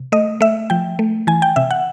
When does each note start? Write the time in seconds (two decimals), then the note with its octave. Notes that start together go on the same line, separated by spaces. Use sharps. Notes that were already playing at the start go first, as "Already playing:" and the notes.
Already playing: C3
0.12 A3 D#5
0.41 A3 E5
0.70 F3 G5
0.99 A3
1.27 E3 G#5
1.42 G5
1.56 C3 E5
1.71 F#5